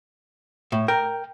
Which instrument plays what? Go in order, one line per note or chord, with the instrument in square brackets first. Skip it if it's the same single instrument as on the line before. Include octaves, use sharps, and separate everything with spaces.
[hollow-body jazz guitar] A2
[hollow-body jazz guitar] A#4 [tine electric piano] G5